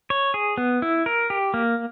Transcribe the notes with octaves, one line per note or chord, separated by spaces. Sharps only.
C#5
G#4
B3
E4
A#4
G4
A#3